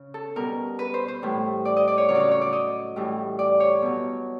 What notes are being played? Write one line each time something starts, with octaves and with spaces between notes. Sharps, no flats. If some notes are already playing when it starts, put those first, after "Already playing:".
Already playing: C#3
A4
B2 G3 A#4
B4
C5
C5
A2 E3 G3
D5
D#5
D5
C#5
C#3 F#3 C#5
D5
C#5
C#5
D5
D#5
A2 E3 G3
D5
C#5
B2 F#3